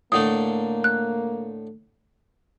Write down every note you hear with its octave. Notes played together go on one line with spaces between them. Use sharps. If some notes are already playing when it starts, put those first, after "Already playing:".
A2 D3 A3 A#3 D#6
F#6